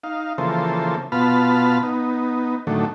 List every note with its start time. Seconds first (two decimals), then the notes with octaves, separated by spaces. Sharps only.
0.04 D#4 F5
0.38 C#3 E3 F3 A#3 A4 C5
1.12 B2 B3 F4 A5 B5 F6
1.83 B3 D#4
2.67 A2 D3 D#3 F#3 A3